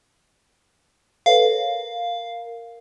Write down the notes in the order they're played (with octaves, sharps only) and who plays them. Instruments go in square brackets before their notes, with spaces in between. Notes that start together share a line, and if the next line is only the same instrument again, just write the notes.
[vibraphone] A4 B4 C#5 [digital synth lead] F5
[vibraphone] A#4